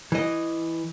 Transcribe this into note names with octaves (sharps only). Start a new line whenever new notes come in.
E3 D#5